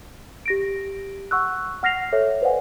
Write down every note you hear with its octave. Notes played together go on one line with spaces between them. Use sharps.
G4 A#6 D7
F#5 C#6 E6 F#6
F#5 F6 A#6 C7 F7
A4 C#5 E5
B4 C5 D5 F5 F#5 G#5